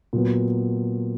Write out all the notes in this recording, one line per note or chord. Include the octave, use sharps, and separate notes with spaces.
A#2 F#3 B3